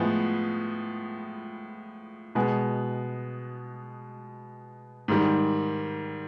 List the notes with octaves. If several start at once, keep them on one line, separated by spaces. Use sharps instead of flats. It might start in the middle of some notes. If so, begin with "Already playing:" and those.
Already playing: A2 F3 G#3 B3
B2 G#3 B3
G#2 D#3 G3